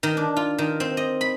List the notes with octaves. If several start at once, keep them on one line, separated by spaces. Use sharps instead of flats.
D#3
D4
F4
D#3
C4
D#5
B5